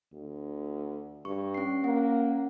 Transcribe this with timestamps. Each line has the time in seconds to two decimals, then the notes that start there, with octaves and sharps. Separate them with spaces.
0.13 D2
1.25 G2 C#6
1.54 C#4 C7
1.84 A#3 C#4 F#5